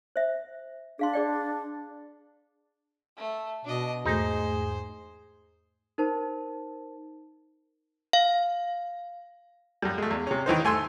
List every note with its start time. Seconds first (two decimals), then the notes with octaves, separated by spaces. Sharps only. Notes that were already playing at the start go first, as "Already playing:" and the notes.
0.16 C5 E5
0.99 D4 G#4 F5 C6
1.13 G#4 D5 G5
3.17 A3
3.65 B2 D4 D#5
4.06 E2 G#2 A3 D#4 G#4 C5
5.98 D#4 A#4 C5 A5
8.13 F5
9.82 F#2 G3
9.98 G#3 A3
10.11 E2
10.27 C3 C#4
10.46 D#3 E3 D#4 C5
10.65 A3 G#5 C6 E6